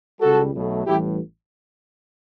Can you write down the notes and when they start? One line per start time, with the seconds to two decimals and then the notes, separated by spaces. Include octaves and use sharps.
0.20 C#2 C#3 G3 F#4 A4
0.53 B1 B2 F#3 A3
0.85 A1 A2 E3 G3 E4 G4